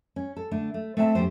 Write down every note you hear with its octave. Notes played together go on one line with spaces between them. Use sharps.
C#4
A4
D3 A3 D4
A3
A3 C4 E5 F5 A5
F#2 A3 G4 C5